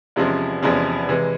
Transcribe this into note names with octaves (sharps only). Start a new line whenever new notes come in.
E2 C3 F3 G#3 C#4
E2 C3 F3 G#3 C#4
C3 E3 G#3